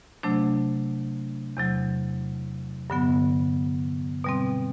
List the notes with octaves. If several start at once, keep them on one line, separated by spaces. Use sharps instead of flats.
C3 F#3 A3 D4
E2 C3 F#3
G2 D3 F#3 B3
B2 G3 C4